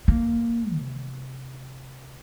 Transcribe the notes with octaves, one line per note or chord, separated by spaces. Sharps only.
A#3
C3